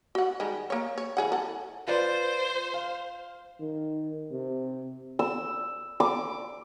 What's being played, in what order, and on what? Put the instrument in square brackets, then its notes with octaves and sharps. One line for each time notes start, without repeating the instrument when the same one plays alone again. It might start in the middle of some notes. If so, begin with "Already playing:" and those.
[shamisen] F#4 F#5
D#3 G3 G#3
A#3 C#5
C#5
E3 G#4 F#5
A4 F#5
[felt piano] F4 B4 D5 [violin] C5
[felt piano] F5
[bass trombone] D#3
C3
[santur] E6
D6